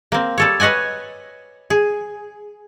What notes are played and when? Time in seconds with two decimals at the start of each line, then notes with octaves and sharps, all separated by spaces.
0.12 A#3 C4
0.38 G3 A4 C#5
0.60 B4 C#5 D#5 F#5 G#5
1.70 G#4